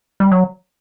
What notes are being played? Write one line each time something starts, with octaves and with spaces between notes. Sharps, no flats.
G3
F#3